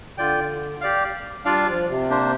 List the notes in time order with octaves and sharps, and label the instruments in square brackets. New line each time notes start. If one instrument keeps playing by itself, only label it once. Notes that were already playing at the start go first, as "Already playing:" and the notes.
[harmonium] D3 [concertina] F4 D5 G5
[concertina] G4 D5 F5
[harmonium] G3 [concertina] D4 F4 D5 F5
[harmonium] F3
C3
[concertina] A#3 D4 G4 C5